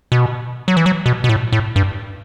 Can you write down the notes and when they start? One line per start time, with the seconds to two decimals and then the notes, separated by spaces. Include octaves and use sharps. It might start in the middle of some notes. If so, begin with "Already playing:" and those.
0.12 B2
0.68 F#3
0.77 E3
0.86 F#3
1.06 B2
1.24 B2
1.29 A2
1.52 A2
1.76 G2